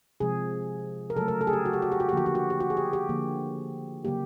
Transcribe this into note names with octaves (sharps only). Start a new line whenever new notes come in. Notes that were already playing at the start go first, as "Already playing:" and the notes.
C3 F3 G#3 G#4
A#4
C#3 F#3 A3 A4
A#4
A4
G#4
G4
F#4
G4
F#4
G4
F#4
G4
D3 F3 A#3 F#4
G4
F#4
G4
F#4
G#4
G4
G4
D3 F3 A#3
C#3 F#3 A#3 G4